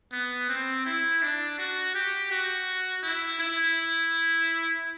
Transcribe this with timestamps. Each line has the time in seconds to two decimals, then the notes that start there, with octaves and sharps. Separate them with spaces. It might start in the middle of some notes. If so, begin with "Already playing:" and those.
0.12 B3
0.49 C4
0.86 E4
1.22 D4
1.59 F#4
1.95 G4
2.31 F#4
3.03 E4
3.39 E4